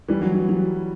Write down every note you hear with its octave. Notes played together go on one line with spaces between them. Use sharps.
E3 G3
F#3
F#3
F#3